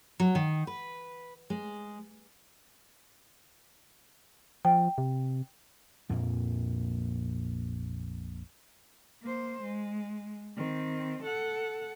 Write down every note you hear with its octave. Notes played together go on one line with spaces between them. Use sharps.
F#3
D#3
B4
G#3
F3 G5
C3
A#1 F2 A#2 A#3
A#3 C5
G#3
D#3 C4
A4 F#5